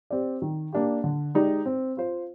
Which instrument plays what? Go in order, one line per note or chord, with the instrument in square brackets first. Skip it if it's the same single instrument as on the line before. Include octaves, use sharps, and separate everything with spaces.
[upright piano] C4 G4 D5
D#3
A#3 D4 G4
D3
G#3 D#4 G4 D5
C4
F4 C5